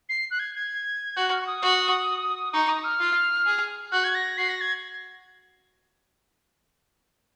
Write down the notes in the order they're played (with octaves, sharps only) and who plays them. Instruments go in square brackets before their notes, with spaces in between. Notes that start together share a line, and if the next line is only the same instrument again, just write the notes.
[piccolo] C7
F#6
G#6
G#6
[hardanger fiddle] F#4 [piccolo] F#6
[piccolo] F6
C#6
D#6
[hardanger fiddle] F#4
[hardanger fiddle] D#4 [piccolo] C#6
[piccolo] D#6
F6
[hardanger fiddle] F4
G#4
[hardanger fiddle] F#4 [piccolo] F#6
[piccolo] G#6
A#6
[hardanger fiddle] F#4 [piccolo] C7
[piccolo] A#6
G#6